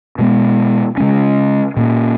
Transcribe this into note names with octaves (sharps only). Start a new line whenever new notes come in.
B2 G#3 B3
C#3 G#3 C#4
A#2 A#3 C#4